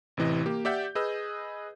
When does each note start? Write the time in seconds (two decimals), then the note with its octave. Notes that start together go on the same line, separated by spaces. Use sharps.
0.17 A1 C3 E3 D#5
0.46 A#3 G4
0.65 G4 D5 E5 F#5 G6
0.95 G#4 B4 D#5 E6